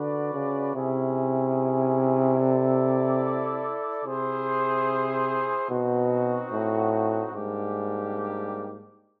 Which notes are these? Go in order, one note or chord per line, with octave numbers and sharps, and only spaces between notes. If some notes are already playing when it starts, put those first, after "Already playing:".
Already playing: D3 F#4 B4 D5
C#3
C3 C#4 E4 G#4
E4 A4 D5
C3 E4 G#4 C5
B2 C4 D#4 F#4
A2
G#2 G3 A#3 D4 G4